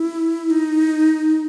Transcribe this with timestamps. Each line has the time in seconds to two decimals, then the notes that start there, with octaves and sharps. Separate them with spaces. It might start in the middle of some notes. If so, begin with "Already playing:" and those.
Already playing: E4
0.50 D#4